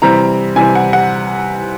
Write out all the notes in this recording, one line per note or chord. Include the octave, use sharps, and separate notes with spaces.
C3 E3 G3 C4 A#5
C3 E3 G3 C4 G#5
F#5
F#5